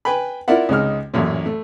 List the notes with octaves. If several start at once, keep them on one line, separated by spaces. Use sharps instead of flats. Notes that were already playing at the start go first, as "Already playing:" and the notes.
B4 G5 G#5 B5
E4 F4 A#4 D5 E5 F#5
C#2 C3 G#3 D#4 F6
A1 F#2 A#2
A3